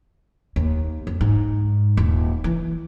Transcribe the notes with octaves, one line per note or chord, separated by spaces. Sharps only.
D#2
F2
G#2
D#1
E3